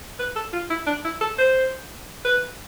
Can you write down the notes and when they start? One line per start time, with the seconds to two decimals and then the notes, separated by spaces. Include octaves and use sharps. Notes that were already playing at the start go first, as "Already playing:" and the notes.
0.19 B4
0.36 A4
0.53 F4
0.70 E4
0.87 D4
1.05 E4
1.21 A4
1.38 C5
2.25 B4